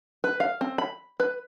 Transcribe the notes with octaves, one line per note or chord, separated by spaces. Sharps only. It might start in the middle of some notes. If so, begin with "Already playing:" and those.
B4
F5
C4
B5
B4